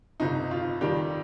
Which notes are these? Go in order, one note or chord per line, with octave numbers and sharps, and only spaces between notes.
G1 F2 C3 D#4
F4
F2 D#3 G3 G4